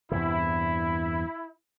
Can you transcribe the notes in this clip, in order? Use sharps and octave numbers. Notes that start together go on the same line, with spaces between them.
E2 G2 C3 E4